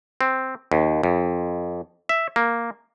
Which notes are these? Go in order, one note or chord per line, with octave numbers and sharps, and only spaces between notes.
C4
D#2
F2
E5
A#3